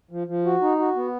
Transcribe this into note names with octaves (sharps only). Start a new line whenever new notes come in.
F3
F3
F#4
D#4
F#4
B3